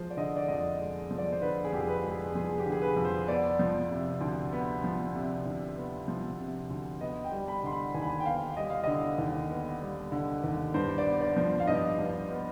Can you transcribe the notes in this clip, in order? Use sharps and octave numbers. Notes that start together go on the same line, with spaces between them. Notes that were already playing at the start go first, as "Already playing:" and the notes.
Already playing: F3 G#3 C5
D5
D3 D#5
D5
F2 D#5
G#3
F3
D5
C5
D3 B4
G#4
F2 G4
G#4
B4
G#3
G#4
F3 G#4
G4
D3
G#4
B4
F2
C5
B3 D5
F3
C3
D2
B3
F3
C3
D2
B3
F3
C3
D2
B3 D#5
G5
G3
B5
D3 C6
B5
D#2 G#5
B5
G#5
G5
B3 F5
G3 D#5
F5
D3 D#5
D#2
B3
G3
D3
D#2
G2 C5
D5
B3
D5
F3
F5
G2 D#5
G2
B3